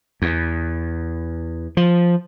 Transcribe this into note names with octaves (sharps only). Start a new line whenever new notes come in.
E2
F3